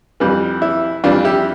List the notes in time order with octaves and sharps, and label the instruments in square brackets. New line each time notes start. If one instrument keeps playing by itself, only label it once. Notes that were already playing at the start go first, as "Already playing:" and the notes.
[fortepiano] F2 E3 G3
E4
F2 E3 G3 D4 F4
E4 G4